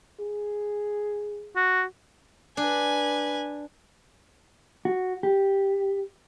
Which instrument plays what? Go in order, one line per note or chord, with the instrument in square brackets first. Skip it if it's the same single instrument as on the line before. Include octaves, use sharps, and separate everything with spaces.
[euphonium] G#4
[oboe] F#4
[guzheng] D4 [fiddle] B4 G#5
[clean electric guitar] F#4
G4